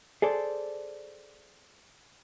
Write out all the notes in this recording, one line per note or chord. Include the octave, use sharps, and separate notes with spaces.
G#4 A4 C5 D5